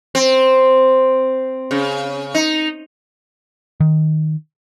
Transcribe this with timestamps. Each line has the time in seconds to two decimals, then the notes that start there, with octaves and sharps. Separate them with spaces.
0.15 C4
1.71 C#3
2.35 D#4
3.80 D#3